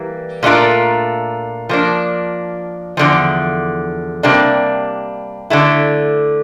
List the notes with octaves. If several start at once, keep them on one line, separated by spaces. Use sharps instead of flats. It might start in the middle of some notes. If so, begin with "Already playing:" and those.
Already playing: E3 G3 A#3
A#2 A3 D4 F4 A#4
F3 A#3 D4
E2 D3 F3
C3 G3 A#3 D4
D3 A3 E4